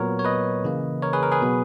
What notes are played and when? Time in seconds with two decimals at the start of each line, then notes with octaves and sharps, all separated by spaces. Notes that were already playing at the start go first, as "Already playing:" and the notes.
Already playing: A#2 F#3 B3 A#4 C#5
0.19 C#5
0.25 B4 D#5
0.64 C#3 E3 A#3
1.02 A#4 C#5
1.13 G#4 B4
1.23 A#4
1.32 G#4 B4
1.42 B2 F#3 B3